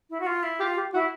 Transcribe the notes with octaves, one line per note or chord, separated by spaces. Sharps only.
E4
F#4
F4
E4
F4 G4
G4
E4 F#4